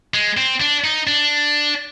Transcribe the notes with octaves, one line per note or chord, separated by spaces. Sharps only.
G#3
C4
D4
D#4
D4